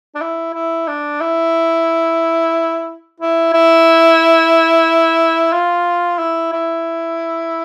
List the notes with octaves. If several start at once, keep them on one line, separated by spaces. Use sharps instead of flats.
D4
E4
E4
D4
E4
E4
E4
F4
E4
E4